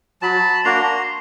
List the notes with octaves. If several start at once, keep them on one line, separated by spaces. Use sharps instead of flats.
F#3 A5 B5
A#3 D4 F#4 A#5 C6